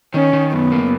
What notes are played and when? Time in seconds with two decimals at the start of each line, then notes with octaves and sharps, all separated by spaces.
0.14 D#3 C#4
0.33 D#3
0.53 F#2 B3
0.72 A#3